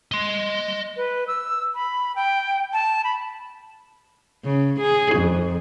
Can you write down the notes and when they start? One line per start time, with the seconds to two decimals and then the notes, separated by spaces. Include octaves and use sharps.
0.12 D#5 C6
0.97 B4
1.28 E6
1.75 B5
2.16 G5
2.73 A5
3.04 B5
4.45 C#3
4.80 G#4
5.15 F2